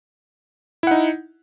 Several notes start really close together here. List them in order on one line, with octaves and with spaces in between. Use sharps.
E4 F#5 D#4